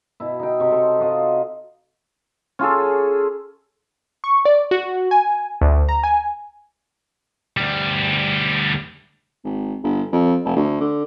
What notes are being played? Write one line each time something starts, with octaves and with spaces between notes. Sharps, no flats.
B2 E4
D#4 G5
C3 C#5
A4 C6
F4 F#4 D#5
C#4 F4 G#4 A4
C#6
D5
F#4
G#5
D2
A#5
G#5
D2 G3
G#1
G1
F2
F1
D2
D3